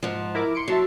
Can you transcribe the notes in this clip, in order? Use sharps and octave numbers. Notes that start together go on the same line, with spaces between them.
G#2 F3
E4 A#4 D6
C6 C#7 D7
F#3 E5 A5 C6